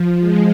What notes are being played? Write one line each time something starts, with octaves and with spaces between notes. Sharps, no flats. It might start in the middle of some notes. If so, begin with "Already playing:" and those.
Already playing: F3
G#3